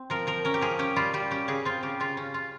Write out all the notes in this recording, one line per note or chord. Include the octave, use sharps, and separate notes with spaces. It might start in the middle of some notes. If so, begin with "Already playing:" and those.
Already playing: C4
F3 A#4
F3 A#4
C#4 A#4
G4
F3 G#4
C#4 G4
G3 F4
G3 G4
C#4 G4
C#3 G#4
C4 F4
C#3 G4
C#3 F4
C#4
F4